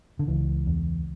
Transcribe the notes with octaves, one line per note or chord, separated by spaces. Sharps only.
D3
C#2 E3
E2